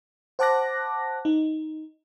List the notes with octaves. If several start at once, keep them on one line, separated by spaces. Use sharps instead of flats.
C5 F#5 A5 D6 F#6 A#6
D#4